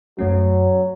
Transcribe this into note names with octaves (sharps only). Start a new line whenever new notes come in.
F#2 F#3 A3 C#4